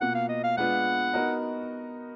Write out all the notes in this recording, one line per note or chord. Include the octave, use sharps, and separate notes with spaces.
B2 A#3 F4 F#5
F5
D#5
F5
G#3 B3 D4 F4 B4 F#5
B3 D#4 F#4 A#4 D#5